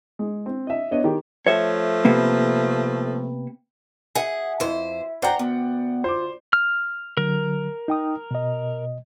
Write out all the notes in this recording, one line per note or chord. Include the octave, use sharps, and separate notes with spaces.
G#3
C4
D#5 E5
B3 D4 C#5 D#5
D#3 G4
F3 A3 C#5 E5
C3 A#3 B3
G#4 E5 F#5
F2 E4 C5
C5 D5 F#5 G5 A#5
D2 B3
F4 C5 D6
F6
D3 F#3 A#4
D#4 G5 D#6
B2 D#5